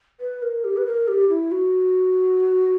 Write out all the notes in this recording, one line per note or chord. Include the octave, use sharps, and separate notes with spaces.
B4
A#4
G4
B4
A#4
G4
E4
F#4